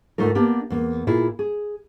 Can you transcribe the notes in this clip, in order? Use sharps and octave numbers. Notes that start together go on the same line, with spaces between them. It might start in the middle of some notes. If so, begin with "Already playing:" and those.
D2 G#2 A3 D#4 F4 A#4
A#3 B3 D4 G4
E2 A#3
A#2 E4 F4 G#4
G#4